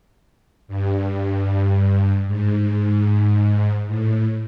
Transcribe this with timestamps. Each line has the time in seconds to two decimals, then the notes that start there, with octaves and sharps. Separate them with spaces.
0.68 G2
2.27 G#2
3.87 A2